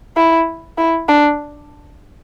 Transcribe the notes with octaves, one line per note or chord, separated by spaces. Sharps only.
E4
E4
D4